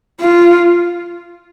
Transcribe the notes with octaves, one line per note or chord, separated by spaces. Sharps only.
F4